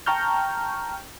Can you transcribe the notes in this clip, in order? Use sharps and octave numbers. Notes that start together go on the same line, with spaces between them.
G5 A5 A#5 C#6 F6 G6